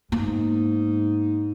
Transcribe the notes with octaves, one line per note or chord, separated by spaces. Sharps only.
G#2 A#3 B3 D#4